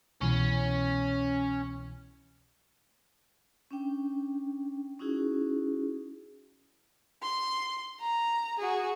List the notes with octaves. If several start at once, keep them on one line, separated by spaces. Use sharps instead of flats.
C2 B2 E3 C#4
C#4 D4 G5
C#4 D#4 E4 F#4 G#4
C6
A#5
F#4 G#4